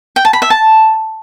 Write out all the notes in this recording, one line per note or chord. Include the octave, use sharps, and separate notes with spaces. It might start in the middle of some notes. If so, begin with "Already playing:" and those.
G5
A5
B5
E5
A5